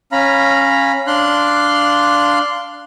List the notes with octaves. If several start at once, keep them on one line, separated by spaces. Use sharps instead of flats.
C#4 F5 A#5 B5
D4 F5 C6 F#6